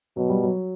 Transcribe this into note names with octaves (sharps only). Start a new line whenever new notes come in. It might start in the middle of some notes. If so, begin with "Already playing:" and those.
B2 F#3
G3
F#3